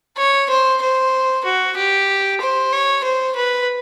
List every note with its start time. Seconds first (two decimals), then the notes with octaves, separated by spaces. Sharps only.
0.17 C#5
0.50 C5
0.82 C5
1.45 F#4
1.77 G4
2.41 C5
2.73 C#5
3.04 C5
3.36 B4